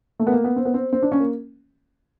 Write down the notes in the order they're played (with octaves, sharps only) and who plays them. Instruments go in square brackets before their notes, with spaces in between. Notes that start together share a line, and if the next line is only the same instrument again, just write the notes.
[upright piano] A3
B3
A#3
B3
C4
B3
C4
C4
D4
C#4
A#3